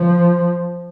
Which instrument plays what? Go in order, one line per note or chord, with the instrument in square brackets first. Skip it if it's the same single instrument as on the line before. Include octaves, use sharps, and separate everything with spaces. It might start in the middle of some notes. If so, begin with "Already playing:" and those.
Already playing: [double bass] F3